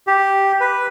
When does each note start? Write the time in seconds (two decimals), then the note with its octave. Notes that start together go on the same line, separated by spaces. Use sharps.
0.07 G4
0.60 B4